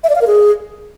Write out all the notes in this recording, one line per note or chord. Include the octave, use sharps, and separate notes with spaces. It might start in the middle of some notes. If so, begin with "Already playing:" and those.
E5
D5
F5
A#4
G#4